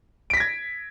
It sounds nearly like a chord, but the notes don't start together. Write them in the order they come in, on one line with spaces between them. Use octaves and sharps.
D7 B6 A#6 G#6